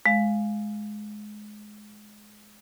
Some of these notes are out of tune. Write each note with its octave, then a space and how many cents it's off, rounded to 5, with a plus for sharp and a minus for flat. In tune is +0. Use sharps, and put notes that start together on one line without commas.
G#3 +20 F5 +0